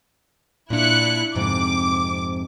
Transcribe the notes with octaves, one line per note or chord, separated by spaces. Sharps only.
A#2 D4 E4 F#6 C#7
F2 G#2 C3 D6